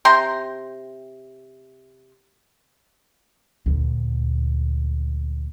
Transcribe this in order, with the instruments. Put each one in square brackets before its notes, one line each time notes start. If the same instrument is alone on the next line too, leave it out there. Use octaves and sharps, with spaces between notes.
[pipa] C3 G5 A#5 C6
[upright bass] D2 A#2